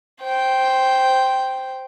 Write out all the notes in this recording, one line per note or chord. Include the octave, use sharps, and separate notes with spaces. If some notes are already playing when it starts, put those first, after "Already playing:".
C5 G5